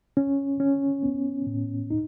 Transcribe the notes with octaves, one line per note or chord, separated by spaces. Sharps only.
C#4
C#4
B3
A2
D#4